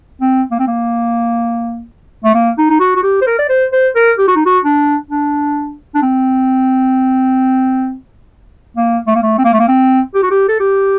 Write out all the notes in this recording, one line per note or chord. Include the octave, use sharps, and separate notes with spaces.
C4
A#3
C4
A#3
A3
A#3
D#4
D#4
F#4
F#4
G4
C5
A#4
D5
C5
C5
A#4
G4
F#4
D#4
F#4
D4
D4
D4
C4
A#3
A3
A#3
A3
C4
A#3
A3
A#3
C4
G4
F#4
G4
A4
G4